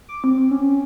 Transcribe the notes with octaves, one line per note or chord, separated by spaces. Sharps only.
D6
C4
C#4